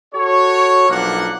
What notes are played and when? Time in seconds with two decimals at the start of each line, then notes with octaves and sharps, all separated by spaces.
0.13 F#4 A4 C#5
0.89 B1 F3 A#3 D4 F#5